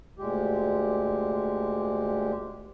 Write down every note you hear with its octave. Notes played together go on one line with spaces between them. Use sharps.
D2 A#2 G#3 G4